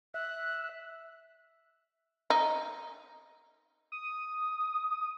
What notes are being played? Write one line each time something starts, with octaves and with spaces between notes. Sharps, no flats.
E5 F#6
D#4
D#6